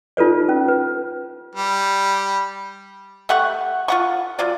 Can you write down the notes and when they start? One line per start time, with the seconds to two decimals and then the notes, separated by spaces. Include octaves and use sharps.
0.17 D#4 F4 A4 B4 D5
0.49 C#4
0.68 B4
1.55 G3
3.29 A3 G4 F#5 C#6
3.88 F4 F#5 C#6
4.39 F#3 F4 D5